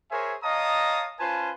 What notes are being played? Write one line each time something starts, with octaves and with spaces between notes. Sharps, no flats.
G#4 A#4 C5 C#5 E5 G#5
C#5 D#5 F5 A5 A#5 D#6
C#4 F4 B4 C5 G#5 A5